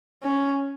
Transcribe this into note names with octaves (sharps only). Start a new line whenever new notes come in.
C#4